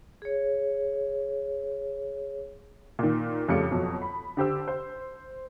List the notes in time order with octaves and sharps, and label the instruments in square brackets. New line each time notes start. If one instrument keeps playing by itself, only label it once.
[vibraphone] G#4 C#5
[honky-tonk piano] A#2 D#3
F2 C#3 G3 A3 D6 C#7
F2 B2 F#3
B5
D3 G4 C5 E6
C5